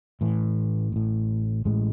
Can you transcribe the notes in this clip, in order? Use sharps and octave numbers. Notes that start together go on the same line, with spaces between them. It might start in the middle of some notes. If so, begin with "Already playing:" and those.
A1 A2 E3
A1 A2
A1 A2 G#3